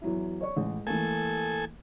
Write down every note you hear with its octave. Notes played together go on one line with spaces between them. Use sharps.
E2 F#3 E4
C#5 D5 C#6
A1 G#3
E3 A3 A#3 A4 G#5